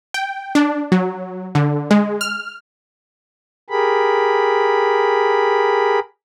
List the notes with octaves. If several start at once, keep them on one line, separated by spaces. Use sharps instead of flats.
G5
D4
F#3
D3
G#3
F6
G4 G#4 A#4 B5